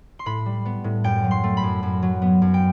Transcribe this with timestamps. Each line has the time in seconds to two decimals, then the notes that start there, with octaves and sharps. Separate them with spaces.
0.19 C6
0.26 A2 B5
0.46 G3
0.65 B3
0.84 A2
1.04 F#2 G5
1.24 F#3
1.31 C6
1.44 A3
1.57 B5
1.63 F#2
1.83 F#2
2.03 F#3
2.22 B3
2.42 F#2
2.54 G5